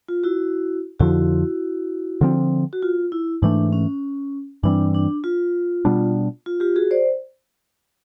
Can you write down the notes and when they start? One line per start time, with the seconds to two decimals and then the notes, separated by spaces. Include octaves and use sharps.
0.08 F4
0.24 E4 F#4
1.00 F2 D3 F3 E4 F#4
2.21 D3 F3 A3 C4
2.73 F#4
2.82 F4
3.12 E4
3.42 G#2 E3 A3 D4
3.73 C#4
4.63 G2 E3 G3 C4 D4
4.95 D4
5.24 F4
5.85 B2 G3 B3 D4
6.46 F4
6.60 F4 G4
6.76 F#4 G#4
6.91 C5 D5